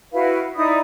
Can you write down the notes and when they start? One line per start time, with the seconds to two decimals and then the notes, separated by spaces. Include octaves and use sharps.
0.13 E4 F#4 B4 F5
0.56 D#4 E4 D5 D#6